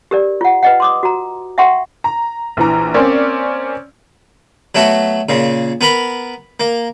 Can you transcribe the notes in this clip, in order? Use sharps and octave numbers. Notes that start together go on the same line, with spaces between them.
G4 A#4 D5
F4 F#5
B4 D#5 F#5
C6 D6 D#6
F#4 A#5
E5 F#5 G5 C6 C#6
A#5
A#1 E3 A#5
A#3 C4 C#4 D5
F#3 A3 B3 F#4
A#2 C#3
B3 A#4 B5
A#3